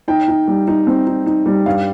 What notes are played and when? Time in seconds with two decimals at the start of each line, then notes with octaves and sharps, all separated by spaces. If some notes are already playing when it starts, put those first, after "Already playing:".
0.08 D#4 G5
0.28 D#4
0.47 G3
0.68 D#4
0.87 C4
1.07 D#4
1.26 D#4
1.46 G3
1.66 G2 F5